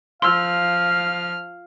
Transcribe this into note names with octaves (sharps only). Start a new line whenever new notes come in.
F3 F5 C6 E6 F6